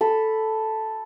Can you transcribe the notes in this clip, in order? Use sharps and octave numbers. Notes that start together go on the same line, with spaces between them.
A4 B5